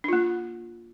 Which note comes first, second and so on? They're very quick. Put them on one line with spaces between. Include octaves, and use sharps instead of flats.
D4 F4 A#3